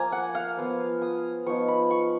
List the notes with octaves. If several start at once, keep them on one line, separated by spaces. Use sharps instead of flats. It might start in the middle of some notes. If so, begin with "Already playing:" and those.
Already playing: F3 A#3 F4 G#5 A#5
F#5
F5
F3 B3 F4
D#6
F3 B3 D#4 C#6
B5
C#6